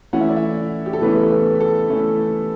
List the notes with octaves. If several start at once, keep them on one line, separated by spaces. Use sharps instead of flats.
E3 A3 C#4 E4 F#5
E5
D5
E4 E5
G4
A4
E3 A3 B3 C#4 E4 B4
B3 B4
A4
E3 A3 C#4 E4